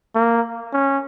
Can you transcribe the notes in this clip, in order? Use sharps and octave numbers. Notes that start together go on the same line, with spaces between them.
A#3
C#4